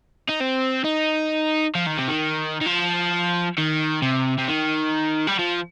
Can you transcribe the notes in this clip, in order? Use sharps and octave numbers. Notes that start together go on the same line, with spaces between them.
D#4
C4
D#4
F3
D#3
C3
D#3
D#3
F3
D#3
C3
C3
D#3
G3
F3